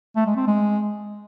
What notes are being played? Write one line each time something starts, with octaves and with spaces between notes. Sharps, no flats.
A3
G#3
C4
G#3